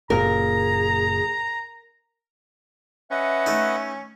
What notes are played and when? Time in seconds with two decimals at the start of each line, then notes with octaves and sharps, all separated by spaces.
0.10 F#1 A#2 G#4 A#4 A#5
3.11 C#4 B4 D#5 E5 F#5
3.46 A3 D#4